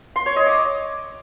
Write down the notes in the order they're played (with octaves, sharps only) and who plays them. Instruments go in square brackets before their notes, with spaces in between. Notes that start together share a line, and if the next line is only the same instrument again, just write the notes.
[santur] C6
C#5
D#5
D6